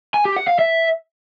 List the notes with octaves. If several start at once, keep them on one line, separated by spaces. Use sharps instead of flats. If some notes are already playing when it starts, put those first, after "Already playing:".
G#5
G4
F#5
F5
E5